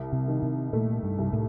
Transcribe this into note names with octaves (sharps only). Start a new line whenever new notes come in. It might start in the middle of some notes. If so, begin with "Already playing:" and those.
Already playing: C2
C3
D#3
C3
A#2 A3
G2
C2
A2